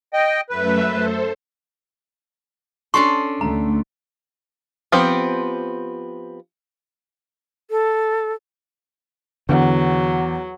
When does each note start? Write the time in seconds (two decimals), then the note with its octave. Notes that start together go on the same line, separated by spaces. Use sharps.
0.13 D#5 G5
0.50 F#2 A3 B4 E5
0.85 A4 C5
2.94 C#4 D4 A4 C6 C#6
3.41 D2 D3 A3 A#5
4.92 F3 B3 C4 G4
7.71 A4
9.49 E2 D3 F#3